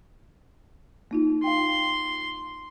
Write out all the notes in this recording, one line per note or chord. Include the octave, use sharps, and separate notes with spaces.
A#3 D#4 F4
F5 G5 C6